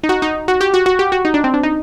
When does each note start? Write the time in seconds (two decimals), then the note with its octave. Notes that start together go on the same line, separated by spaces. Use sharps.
0.03 D#4
0.09 F#4
0.22 D#4
0.48 F#4
0.61 G4
0.74 F#4
0.86 F#4
0.99 G4
1.12 F#4
1.25 D#4
1.34 D4
1.44 C4
1.54 D4
1.63 D#4